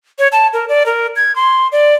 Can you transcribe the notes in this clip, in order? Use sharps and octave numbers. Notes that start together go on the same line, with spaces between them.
C#5
A5
A#4
D5
A#4
G#6
C6
D5